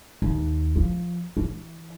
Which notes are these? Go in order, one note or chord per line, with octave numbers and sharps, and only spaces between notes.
D#2
F3
E3